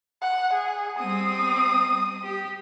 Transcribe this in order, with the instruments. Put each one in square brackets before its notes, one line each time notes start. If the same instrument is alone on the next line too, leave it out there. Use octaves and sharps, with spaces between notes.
[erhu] F#5
G#4
[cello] G3 C4 [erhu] D#6
[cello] G4